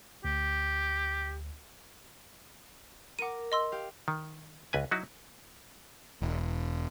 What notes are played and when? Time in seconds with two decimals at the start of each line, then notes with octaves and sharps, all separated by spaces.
0.25 D2 G4
3.19 A#4 F#5 D6 D#7
3.52 D#5 C6 E6
3.72 G4 F5
4.08 D#3
4.73 C#2 B4 G#5
4.91 F#3 D#4 E4 F#4
6.22 E1